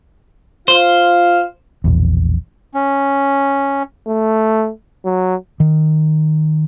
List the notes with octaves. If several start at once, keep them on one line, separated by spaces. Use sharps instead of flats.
F4 C5 F5
E1 A#1 E2
C#4
A3
F#3
D#3